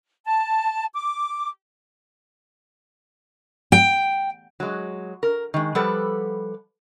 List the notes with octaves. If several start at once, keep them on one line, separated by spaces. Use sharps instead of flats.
A5
D6
G5
F#3 G#3
A#4
D#3 G#3
F3 G3 G4 A4 B4 F#5